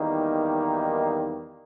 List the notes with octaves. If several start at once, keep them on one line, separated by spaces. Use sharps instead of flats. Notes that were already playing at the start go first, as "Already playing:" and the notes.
Already playing: E2 D#3 G3 A#3 D#4